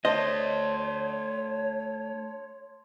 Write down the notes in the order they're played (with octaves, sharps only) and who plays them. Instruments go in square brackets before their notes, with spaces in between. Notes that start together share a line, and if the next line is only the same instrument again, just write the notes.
[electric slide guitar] A3 D4 [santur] C5 A5 [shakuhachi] C#5 [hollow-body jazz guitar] D#5